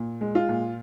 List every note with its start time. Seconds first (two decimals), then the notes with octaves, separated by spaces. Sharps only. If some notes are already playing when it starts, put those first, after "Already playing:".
Already playing: A#2
0.21 G#3
0.35 F4
0.49 A#2